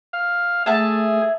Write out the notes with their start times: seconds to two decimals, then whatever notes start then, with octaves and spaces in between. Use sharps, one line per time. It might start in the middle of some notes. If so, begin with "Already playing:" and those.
0.13 F5
0.66 A3 G#4 E5 A5